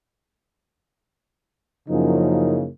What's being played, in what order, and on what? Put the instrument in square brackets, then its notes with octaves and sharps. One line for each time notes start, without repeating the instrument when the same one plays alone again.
[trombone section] F#2 C#3 F3 A#3 D#4 E4